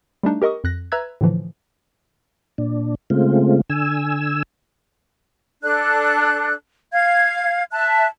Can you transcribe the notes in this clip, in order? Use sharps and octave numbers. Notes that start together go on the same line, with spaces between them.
G3 A3 D4 D#4
G4 A#4 D#5 C#6 D#6
F2 F#6 A#6
B4 E5 A#5 E6 F#6 G#6
A2 D3 E3 F3
A#2 D4
C#3 G#3 A3 C4 F4
D3 G#5 E6
D4 A4 F#6
F5 G#6
E5 A5 F#6